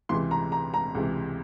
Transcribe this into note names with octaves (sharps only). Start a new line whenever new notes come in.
C#2 C3 E3 C6
A#5
A#5
A#5
C#2 C3 E3